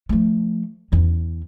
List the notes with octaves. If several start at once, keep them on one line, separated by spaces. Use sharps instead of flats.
F3 A3
E2 C#4